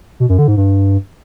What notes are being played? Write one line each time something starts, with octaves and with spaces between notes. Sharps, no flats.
B2
F#2
D3
G#2
G2